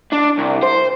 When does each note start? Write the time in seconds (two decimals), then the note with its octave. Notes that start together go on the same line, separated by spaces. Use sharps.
0.12 D4
0.38 C2
0.62 C5